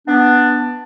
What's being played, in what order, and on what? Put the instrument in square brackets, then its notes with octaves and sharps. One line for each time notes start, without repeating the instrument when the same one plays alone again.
[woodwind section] B3 D4